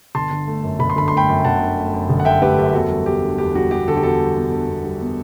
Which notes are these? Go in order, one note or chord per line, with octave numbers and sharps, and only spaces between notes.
G1 A5 C6
D3
A3
F#2
G1 B5
C6
D3 B5
A3 C6
G5 B5
F#2
G1 F#5 A5
D3
A3
F#2
G1
F#5
D3 E5 G5
A3 G4 B4
F#2 G4
E2 F#4 A4
G3
B3 G4
D3
E2 G4
G3 F#4
B3 G4
D3 F#4 A4
G4
E2 F#4 A4
G3
B3
D3
E2
G3
B3